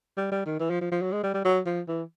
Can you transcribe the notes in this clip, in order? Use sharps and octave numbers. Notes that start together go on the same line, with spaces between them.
G3
G3
D#3
E3
F3
F3
F3
F#3
G#3
G3
G3
F#3
F3
E3